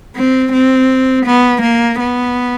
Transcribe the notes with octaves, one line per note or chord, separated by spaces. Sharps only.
C4
C4
B3
A#3
B3